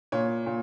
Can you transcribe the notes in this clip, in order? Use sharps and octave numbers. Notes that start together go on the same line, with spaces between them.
A#2 C#5
A#2